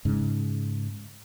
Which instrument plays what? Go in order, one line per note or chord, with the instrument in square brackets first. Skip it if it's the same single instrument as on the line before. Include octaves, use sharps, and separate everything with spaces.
[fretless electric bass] G#2 C#3 G#3